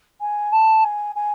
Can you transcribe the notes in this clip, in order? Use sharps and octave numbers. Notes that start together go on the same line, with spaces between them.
G#5
A5
G#5
G#5